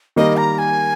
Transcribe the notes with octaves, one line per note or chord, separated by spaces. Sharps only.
D#3 G3 A#3 D#5
A#5
G#5